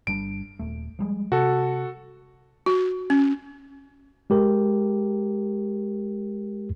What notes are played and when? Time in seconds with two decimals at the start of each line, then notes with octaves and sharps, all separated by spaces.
0.07 G1 G3 D4 D7
0.59 D#1 A3
0.99 F3 G3 G#3
1.32 C3 F#4 A4
2.66 F#4
3.10 C#4
4.30 G#3 G4 A#4